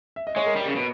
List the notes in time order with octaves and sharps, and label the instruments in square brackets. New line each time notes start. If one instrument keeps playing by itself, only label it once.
[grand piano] E5
D#5
[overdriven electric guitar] G#3 [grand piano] C#5
[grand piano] A#4
[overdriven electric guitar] G3
C#3
B2